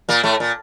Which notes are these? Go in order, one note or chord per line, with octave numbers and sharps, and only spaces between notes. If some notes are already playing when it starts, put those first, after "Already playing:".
A#2 A#3
A2 A3
A#2